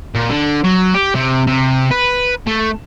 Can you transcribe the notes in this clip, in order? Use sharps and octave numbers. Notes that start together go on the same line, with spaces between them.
A#2
D3
F#3
G4
C3
C3
B4
A3